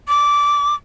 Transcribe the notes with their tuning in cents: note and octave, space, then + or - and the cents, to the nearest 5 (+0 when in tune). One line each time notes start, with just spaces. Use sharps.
D6 -15